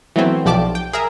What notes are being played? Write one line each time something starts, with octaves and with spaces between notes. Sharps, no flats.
E3 F#3 A3 B3 C4
B1 F3 G4 D5 A5 D6
G5
G#4 A#4 E5 A#5